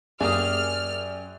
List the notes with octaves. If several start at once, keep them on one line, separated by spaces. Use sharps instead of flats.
F#2 A#3 G4 G#4 D5 D#6 F6